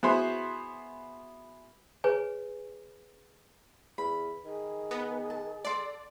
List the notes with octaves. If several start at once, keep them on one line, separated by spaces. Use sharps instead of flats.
B3 E4 F#4 G#4 B4 C5
G#4 B4 C#5 G#5
E2 B5
D#3 G#4
B3 A#5
A5
A4 D5 F#5 C6